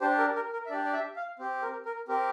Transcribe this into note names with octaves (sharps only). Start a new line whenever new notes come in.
D4 G4 C5
A#4
A#4
A#4
E5
D4 G4 D5
D5
E5
F5
C4 G4
A#4
A#4
C4 G4 A#4